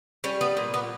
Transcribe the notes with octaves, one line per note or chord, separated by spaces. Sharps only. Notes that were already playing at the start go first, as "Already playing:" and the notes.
G3 C#4
B3
A#2
B3